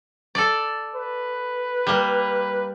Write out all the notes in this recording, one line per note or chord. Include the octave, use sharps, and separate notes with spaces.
A4 D5
B4
G3 A#3